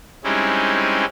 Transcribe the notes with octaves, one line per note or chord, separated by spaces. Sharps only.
G3 G#3 C4 C#4 D#4 E4